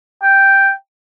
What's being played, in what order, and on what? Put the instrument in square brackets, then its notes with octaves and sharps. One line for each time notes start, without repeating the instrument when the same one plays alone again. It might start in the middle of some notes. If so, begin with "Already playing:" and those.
[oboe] G5